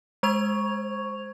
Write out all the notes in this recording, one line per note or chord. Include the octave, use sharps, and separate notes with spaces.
G#3 C5 C#6 G#6 F7